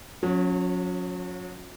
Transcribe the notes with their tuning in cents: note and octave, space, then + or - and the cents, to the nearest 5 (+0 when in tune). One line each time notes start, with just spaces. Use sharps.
F#3 -40 C#4 +0